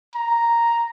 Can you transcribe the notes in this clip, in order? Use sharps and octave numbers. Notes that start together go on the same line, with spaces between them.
A#5